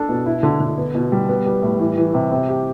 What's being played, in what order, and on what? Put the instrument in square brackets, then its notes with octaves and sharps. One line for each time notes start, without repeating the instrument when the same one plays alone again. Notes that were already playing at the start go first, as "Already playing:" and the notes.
Already playing: [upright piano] D4 A4
B2
E4
D3
D3
B3
B2
G3
B3
G3
A2
E3
E3
C3
C3
G4